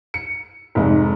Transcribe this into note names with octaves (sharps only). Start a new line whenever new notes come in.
C#7
F1 G#2